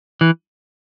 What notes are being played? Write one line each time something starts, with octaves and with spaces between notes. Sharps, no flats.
E3